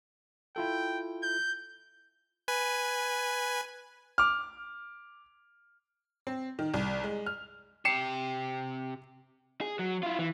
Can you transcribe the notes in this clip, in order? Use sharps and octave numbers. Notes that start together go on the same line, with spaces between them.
E4 F4 A4 G5
G6
B4 G#5
D6 F6
C4
D#3
C2
G#3
F6
C3 G4 C7 C#7 E7
G#4
F#3
E4 F4
E3